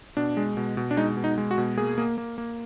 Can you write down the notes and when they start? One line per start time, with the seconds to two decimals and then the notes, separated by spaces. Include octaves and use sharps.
0.17 B2 D4
0.37 G#3
0.57 B2
0.77 B2
0.91 D4
0.97 G#3 D#4
1.17 B2
1.24 D#4
1.38 G#3
1.51 F#4
1.58 B2
1.77 A#3 G#4
1.98 A#3
2.18 A#3
2.38 A#3